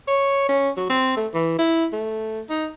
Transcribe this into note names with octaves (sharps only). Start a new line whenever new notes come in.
C#5
C#4
F#3
C4
A3
E3
E4
A3
D#4